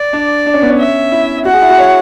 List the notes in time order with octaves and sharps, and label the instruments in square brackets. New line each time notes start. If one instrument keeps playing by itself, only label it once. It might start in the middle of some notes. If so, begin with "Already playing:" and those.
Already playing: [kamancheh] D5
[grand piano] D4
D4
C#4
B3
C#4
[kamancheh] E5
[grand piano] E4
[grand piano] F#4 [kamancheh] F#5
[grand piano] G#4
E4
F#4
C#5